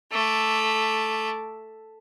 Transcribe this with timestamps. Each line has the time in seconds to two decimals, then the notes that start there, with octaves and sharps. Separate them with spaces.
0.11 A3 D6